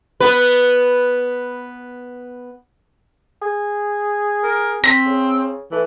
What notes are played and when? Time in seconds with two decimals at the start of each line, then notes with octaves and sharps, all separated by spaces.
0.20 B3 B4
3.42 G#4
4.44 A#4
4.84 C4 A#6 B6
5.06 C#3
5.72 E3 A3